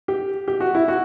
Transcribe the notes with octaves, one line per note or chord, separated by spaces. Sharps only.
G4
G4
F#4
E4
F#4